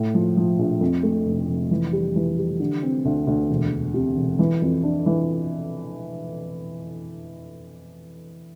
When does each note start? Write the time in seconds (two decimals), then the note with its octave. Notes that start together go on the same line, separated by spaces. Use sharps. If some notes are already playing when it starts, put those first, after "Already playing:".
Already playing: A2
0.14 F3
0.37 F3
0.59 A#1
0.81 F2
1.03 A3
1.26 F1
1.49 F1
1.71 E3
1.93 G3
2.16 E3
2.38 G3
2.60 D3
2.83 C4
3.05 D2
3.27 D2
3.50 E1
3.72 E1
3.94 C3
4.17 E1
4.39 E3
4.62 F2
4.83 D4
5.06 E3